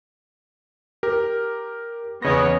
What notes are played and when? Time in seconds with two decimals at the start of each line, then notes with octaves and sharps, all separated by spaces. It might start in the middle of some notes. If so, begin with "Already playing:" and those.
1.03 G4 A#4
2.22 E2 C#3 B3 C#5 D#5 A#6